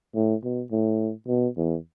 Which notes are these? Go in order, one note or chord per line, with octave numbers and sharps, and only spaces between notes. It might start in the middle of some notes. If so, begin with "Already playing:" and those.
A2
B2
A2
B2
E2